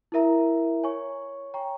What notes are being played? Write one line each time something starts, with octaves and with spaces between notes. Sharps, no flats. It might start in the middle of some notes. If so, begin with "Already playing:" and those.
E4 A#4 E5 A#5
C#5 G#5 C#6
C#5 G5 A#5 C#6